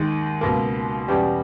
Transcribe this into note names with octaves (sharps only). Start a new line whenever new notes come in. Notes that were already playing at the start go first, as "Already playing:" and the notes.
Already playing: D#2 D#3 G#3
C#2 B2 A#3
E2 B2 G3 C#4 G4